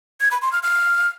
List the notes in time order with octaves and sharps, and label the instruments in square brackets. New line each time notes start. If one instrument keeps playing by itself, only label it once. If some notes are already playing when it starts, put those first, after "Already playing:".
[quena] G#6
B5
C6
F6
F6